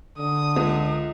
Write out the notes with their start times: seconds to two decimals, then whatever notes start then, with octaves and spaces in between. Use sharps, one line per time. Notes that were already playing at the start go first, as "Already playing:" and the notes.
0.18 D3 D#6
0.56 C#2